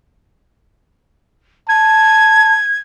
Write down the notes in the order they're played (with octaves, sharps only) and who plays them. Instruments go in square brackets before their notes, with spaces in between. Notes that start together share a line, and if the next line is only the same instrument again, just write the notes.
[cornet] A5 [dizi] G#6